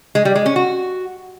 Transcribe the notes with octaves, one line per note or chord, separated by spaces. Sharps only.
G#3
G3
G#3
C#4
F#4